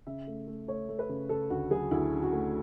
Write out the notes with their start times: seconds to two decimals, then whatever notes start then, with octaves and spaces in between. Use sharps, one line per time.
0.07 C#3 E5
0.27 A3
0.48 A3
0.68 A3 C#5
0.89 A3
0.99 B4
1.09 C#3
1.29 C#3 A4
1.50 D2 F#4
1.71 F#3 G#4
1.91 D2 E4
2.12 C#3
2.23 F#4
2.32 A3